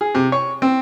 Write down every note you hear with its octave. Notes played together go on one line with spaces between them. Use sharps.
G#4
C3
C#5
C4